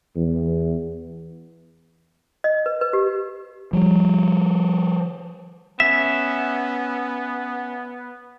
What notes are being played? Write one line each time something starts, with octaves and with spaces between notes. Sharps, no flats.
E2
D#5
B4
B4
G4
F3 G3
B3 C#4 E5 B6